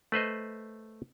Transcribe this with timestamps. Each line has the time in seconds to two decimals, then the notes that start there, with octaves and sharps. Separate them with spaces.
0.12 A3 B4 C5 D#5